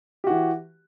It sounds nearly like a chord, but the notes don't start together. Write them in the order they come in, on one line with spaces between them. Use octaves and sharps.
G4 F#4 E3